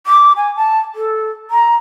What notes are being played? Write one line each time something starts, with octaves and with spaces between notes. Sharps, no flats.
D6
G#5
A5
A4
A#5